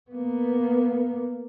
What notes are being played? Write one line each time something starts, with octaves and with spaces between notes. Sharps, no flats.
A#3 B3